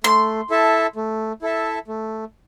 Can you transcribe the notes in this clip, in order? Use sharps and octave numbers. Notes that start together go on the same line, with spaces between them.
A3 C6
E4 A4 E5 A5
A3
E4 A4 E5 A5
A3